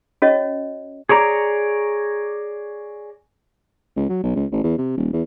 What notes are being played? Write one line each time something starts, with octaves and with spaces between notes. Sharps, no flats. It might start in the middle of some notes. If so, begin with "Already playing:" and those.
C#4 F#4 C#5 D#5
G#4 C#5 D5 A#5
C#2
F#3
B1
C#2
A1
E2
C3
D#1
E2